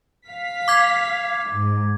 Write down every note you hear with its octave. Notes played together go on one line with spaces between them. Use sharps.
F5 B6
D6 G#6
G#2